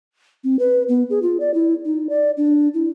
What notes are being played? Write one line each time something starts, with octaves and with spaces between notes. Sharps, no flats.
C4
B4
B3
G#4
F4
D5
E4
D#4
D5
D4
E4